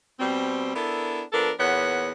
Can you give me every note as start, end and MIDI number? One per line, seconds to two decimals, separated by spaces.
0.19 0.74 47
0.19 0.74 55
0.19 0.74 60
0.75 1.22 59
0.75 1.22 62
0.75 1.22 64
0.75 1.22 69
0.75 1.22 70
1.33 1.51 53
1.33 1.51 59
1.33 1.51 62
1.33 1.51 69
1.33 1.51 70
1.59 2.11 40
1.59 2.11 46
1.59 2.11 59
1.59 2.11 73
1.59 2.11 78